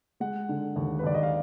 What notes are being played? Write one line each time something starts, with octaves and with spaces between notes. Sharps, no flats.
G#3 F#5
D3
D#2
B4
D#2 D5
D#5
F5